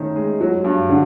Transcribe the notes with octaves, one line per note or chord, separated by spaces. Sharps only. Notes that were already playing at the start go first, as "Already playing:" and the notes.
Already playing: D#3 A3 C#4
G#3
F#3
G2
D3